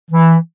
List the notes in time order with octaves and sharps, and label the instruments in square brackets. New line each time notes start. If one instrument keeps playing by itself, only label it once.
[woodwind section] E3